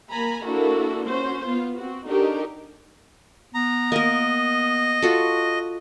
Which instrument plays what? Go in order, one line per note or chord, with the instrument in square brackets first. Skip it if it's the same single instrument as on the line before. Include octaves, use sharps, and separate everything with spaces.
[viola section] A#3 G#5 A#5 B5
A#3 D4 E4 F#4 A4
C#4 F#4 C5
B3 F4
C4 F#4
D4 D#4 F#4 G4 A4 A#4
[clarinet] B3 [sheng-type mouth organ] A#5
[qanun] A#3 A#4 [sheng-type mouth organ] D#5
[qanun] F4 F#4 A4